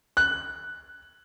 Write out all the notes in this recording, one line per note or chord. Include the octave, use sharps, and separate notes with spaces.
F#6